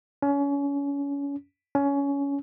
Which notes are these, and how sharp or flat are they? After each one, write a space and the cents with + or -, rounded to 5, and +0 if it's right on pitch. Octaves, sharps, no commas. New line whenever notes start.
C#4 +30
C#4 +20